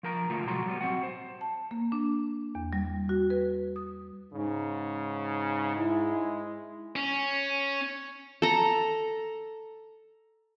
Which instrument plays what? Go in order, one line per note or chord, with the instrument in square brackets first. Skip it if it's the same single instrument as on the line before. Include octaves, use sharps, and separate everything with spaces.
[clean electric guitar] F3 A#4 A#5
D2 F3 A3 F4 A#4
B2 F#3 G#3 F#4 A#5 C6
F#3 G3 B3
C4 F#4 F#5
C5
[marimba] A5
A#3
D4
E2
G3
F#4
B4
D#6
[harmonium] G#2 [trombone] C#3
[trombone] G#3 [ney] E4
[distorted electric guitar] C#4
[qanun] A4 A#5